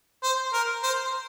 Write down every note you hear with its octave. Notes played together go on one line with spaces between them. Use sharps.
C5
A#4
C5